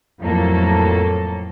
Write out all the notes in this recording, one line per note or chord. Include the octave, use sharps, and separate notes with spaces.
F2 A2 F#3 A#3 A4